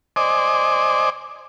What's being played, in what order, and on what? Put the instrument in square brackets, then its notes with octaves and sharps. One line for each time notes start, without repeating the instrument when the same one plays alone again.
[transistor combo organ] C5 D5 D#5 G#5 D6